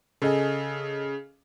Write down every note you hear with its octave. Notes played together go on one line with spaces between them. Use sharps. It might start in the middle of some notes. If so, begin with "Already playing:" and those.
C#3 A4 D#5 G#5